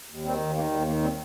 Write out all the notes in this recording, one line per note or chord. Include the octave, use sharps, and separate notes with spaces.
D#2
D#3 G3 C4
D#2
D#3 A#3
D#2 G3
D#3 A#3
G3 C4